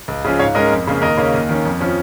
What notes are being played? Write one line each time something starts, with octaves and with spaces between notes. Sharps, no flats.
C#2
C#3 F3 C#4
G#2 C#5 F5
G#3 C#4 A#4 D#5
F2
C#3 A#3 C#4
D#2 A#4 D#5
C#3 A#3 C#4
D#2
D#3 C#4
F2
F3 C#4